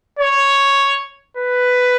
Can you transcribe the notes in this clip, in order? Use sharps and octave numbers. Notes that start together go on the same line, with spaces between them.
C#5
B4